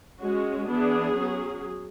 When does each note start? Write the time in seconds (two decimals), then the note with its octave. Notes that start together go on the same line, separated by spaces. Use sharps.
0.21 G#3 C#4 F#4
0.68 E3 B3 D4 G#4
1.15 F#3 C#4